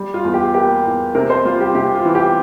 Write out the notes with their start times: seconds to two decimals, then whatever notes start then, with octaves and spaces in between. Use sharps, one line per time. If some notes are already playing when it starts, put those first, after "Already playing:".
Already playing: G3
0.14 F4
0.24 E2
0.34 G4
0.54 A#3 G4
0.84 E2
1.15 C3 A#4
1.30 C5
1.45 G3 F4
1.60 G4
1.75 C3 G4
1.94 F4
2.05 E3
2.15 G4